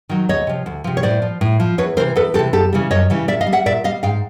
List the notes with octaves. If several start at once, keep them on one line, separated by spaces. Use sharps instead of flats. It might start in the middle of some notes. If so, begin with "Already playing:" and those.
D#3 F#3
D2 C#5 D#5
C3 F3
D2
C3 F3
C#5
A2 C5 D5
F3
A2
F3
E2 B4 C#5
C3 E3 A#4 C5
E2 A4 B4
C3 E3 G4 A4
F#2 G4 A4
C#3 E3 G3
F#2 C#5 D#5
C#3 E3 G3
A#2 D5 E5
D#5 F5
G3
E5 F#5
A#2 D5 E5
G3 D#5 F5
G#2 F5 G5